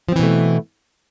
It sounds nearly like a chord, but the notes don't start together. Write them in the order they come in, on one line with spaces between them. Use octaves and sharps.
F3 C4 E3 B2 A3